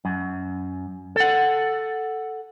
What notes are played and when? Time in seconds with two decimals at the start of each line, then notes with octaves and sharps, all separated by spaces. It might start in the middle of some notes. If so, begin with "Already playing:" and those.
0.05 F#2
1.16 A4 F#5